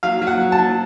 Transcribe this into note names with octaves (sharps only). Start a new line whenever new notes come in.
F#3 F5
F#3
F#5
F#3
A5
F#3